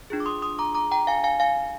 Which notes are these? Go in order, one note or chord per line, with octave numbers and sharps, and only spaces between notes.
D4 F4 G#4
D6
C6 D#6
C6 D#6
A#5 D6
A#5 D6
G5 A#5
F5 G#5
F5 G#5
F5 G#5